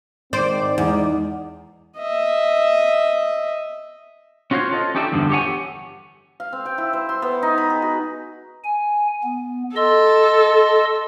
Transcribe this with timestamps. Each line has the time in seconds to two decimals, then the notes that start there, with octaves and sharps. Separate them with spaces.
0.33 G#2 D#3 C4 C5 D5
0.78 E2 G#3 D#4
1.97 D#5 E5
4.51 C#4 F4 F#4 A#4 C5 C#5
4.71 F4 A4 D#5
4.95 C#4 D#4 G4 A4 D5 E5
5.12 E2 G2 D3 F3
5.30 G4 A4 C#5 D5 F#5 G#5
6.40 F5
6.53 C4
6.65 G5
6.78 E4
6.93 C5
7.09 C6
7.22 B3
7.43 D#4
7.58 B5
7.70 G#4
7.82 F#4
8.64 G#5
9.23 B3
9.76 A4 D#5 C6 E6